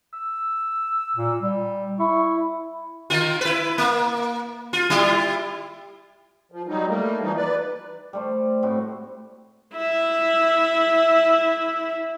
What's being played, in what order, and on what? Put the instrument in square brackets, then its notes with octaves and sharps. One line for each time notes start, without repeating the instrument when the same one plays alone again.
[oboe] E6
[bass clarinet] A#2
G3
[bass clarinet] E4 [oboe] C#6
[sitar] D#3 F4
E4 B4
A#3
F4
G3 E4 F4
[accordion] F3
F#3 G3 D#4
G3 A3 A#3
E3 F3 G3 D#4
B4 D5
[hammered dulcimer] G3 A3 C5
A2 C4 E4 F#4
[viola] E4 E5